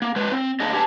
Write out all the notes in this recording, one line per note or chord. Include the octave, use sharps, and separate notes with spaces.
A#3
G#3 B4 C5
C4
A#3 D4 G#4 D#5
G4 G#4 B4 A5